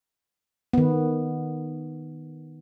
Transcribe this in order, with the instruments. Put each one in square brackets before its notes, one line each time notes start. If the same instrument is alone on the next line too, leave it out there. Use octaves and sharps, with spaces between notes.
[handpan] D#3 B3